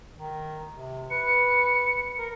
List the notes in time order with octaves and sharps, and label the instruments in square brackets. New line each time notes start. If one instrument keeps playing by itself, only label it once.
[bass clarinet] D#3
C3
[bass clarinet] B4 [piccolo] C#7
[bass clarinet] A#4